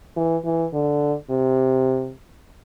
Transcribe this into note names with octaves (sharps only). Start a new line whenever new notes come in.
E3
E3
D3
C3